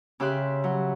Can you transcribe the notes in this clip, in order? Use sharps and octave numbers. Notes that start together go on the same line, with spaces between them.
C#3 G4 E5 C6 D6 F#6
F#3